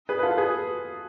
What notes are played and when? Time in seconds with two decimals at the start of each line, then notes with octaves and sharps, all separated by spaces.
0.09 G#4 B4
0.19 B4
0.23 F4 A4
0.37 G#4 B4